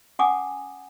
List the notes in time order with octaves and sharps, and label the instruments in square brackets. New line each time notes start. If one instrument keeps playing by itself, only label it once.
[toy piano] C#4 F#5 G#5 A5 D6 D#6